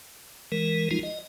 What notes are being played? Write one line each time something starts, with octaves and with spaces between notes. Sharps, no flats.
E3 G#3 A#4
F3 G#3 D#4 F4
D#5